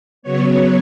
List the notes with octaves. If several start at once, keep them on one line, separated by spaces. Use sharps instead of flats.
C#3 F#3 B3 C#5